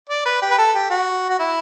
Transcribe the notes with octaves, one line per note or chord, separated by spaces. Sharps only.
D5
B4
G4
B4
A4
G4
F#4
F#4
E4